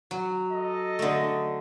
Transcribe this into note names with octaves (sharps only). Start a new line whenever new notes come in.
F#3
A4 D#5
D3 A3